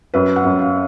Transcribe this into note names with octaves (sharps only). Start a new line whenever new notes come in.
F#2 B4
F#5
F#2
F5